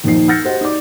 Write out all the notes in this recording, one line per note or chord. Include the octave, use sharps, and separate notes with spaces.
D#2 A#2 F3 D#4 C5 C7
E6 F6 G6 A6 A#6 C#7
F#4 G4 C5 D#5 F#5
D#4 F#4 D5 D6